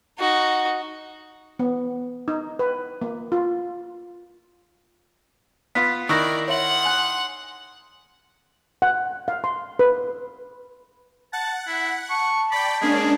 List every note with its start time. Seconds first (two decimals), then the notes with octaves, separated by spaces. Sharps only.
0.19 D#4 F#4
1.59 B3
2.28 D#4
2.59 B4
3.02 A#3
3.32 F4
5.75 B3 F4 B6
6.09 D#3 E4 D5 C#6 F#6 A#6 C7
6.48 C#5 E5 F#5 C6 F#7
6.85 G#5 F#6
8.82 F#5
9.28 F5
9.44 C6
9.79 B4
11.33 F#5 A5
11.67 E4
12.10 A5 C#6
12.52 D5 G5 B5
12.81 G#3 A#3 C#4 D4 G#4